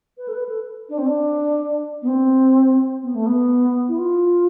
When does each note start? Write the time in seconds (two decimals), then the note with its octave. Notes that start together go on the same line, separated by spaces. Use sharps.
0.18 B4
0.28 A4
0.33 B4
0.49 A4
0.89 D4
0.98 C4
1.06 D4
2.02 B3
2.08 C4
3.03 B3
3.15 A3
3.26 B3
3.88 E4
3.98 F4